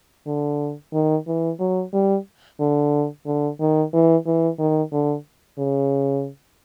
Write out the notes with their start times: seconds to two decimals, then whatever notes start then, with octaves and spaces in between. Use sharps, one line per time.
0.27 D3
0.93 D#3
1.27 E3
1.59 F#3
1.93 G3
2.59 D3
3.26 D3
3.60 D#3
3.93 E3
4.26 E3
4.59 D#3
4.92 D3
5.58 C#3